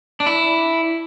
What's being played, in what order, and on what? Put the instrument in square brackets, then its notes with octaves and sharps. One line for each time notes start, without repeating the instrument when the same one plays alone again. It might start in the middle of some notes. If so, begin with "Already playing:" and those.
[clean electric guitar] D4
E4